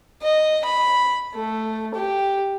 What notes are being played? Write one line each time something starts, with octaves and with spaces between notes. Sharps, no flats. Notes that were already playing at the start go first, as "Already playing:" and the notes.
D#5
B5
A3
G4